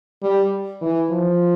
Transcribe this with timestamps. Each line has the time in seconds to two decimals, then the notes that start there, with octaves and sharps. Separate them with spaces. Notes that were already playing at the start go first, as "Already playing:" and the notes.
0.23 G3
0.82 E3
1.11 F3